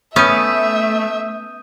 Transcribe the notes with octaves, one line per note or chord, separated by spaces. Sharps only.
A3 B3 C#4 E5 D#6 G6 D#7